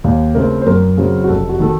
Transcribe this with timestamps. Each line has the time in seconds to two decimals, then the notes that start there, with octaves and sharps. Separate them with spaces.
0.04 D#2
0.35 C#3 A3 C4 A#4
0.62 C5
0.66 F#2 A#4
0.97 C#3 F#3 C4
1.24 F#4
1.29 F1 A4
1.49 F#4
1.60 D#3 A4